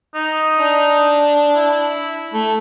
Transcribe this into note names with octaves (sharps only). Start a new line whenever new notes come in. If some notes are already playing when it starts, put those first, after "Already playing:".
D#4
D4
E4
A3